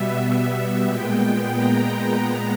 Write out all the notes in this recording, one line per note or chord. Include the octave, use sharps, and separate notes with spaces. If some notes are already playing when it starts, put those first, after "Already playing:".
Already playing: B2 G3 B3 E5
A#2 G#3 B3 G5
G5
A#5
A#2 G#3 B3